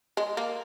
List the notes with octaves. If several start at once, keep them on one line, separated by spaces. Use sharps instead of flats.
G#3
A#3